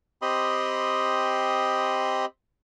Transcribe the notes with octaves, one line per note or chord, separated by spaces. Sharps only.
C4 G4 D#5 B5 C6 D#6